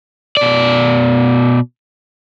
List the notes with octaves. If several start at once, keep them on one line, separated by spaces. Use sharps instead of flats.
B2 D5